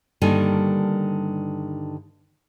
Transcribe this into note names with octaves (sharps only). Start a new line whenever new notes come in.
G2 D3 D#3 G3 A#3 G#5